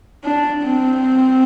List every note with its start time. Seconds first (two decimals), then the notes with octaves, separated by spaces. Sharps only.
0.24 D4
0.63 C4